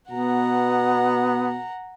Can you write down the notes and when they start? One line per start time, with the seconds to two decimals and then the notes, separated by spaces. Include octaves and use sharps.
0.11 B2 B3 F#5 A#5